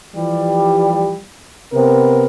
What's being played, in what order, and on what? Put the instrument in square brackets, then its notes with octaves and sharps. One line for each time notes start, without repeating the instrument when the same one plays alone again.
[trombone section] E3 F3 G3
C3 B3 A#4 B4